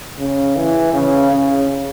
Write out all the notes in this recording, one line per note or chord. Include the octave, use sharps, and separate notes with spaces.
C#3
E3
C#3
C#3